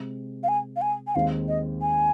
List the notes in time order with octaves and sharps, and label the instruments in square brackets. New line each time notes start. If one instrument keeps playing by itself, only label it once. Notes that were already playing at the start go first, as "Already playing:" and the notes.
Already playing: [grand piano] C3 G#3 C4
[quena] F5
G#5
F5
G#5
G#5
[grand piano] D#2 D#3 G#3 C4 D#4 [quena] F5
[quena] D#5
G#5